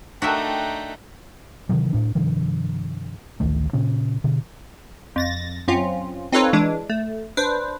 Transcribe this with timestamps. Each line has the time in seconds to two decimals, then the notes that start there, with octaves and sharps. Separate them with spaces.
0.22 A3 D4 D#4 F#4 A#4 E5 G5
1.69 C3 D#3 E3 F#3
1.93 A2 D4
2.15 G2 C3 D#3 F3
3.40 A1 D2 D#3 A3
3.73 A#2 C#3 C#4
4.24 B2 D3
5.16 F2 A6 A#6
5.68 F#2 C4 C#4 F4
6.32 C4 D#4 F4 A4 B4 C#5
6.53 E3 G#3 D4
6.90 A3
7.37 D4 B4 C5